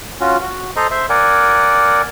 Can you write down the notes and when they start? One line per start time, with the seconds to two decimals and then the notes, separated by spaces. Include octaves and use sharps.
0.21 C#4 F4 F#4
0.41 F#4
0.76 A4 C5 D#5 A#5
0.91 C5 E5
1.10 A#4 D5 F#5 G#5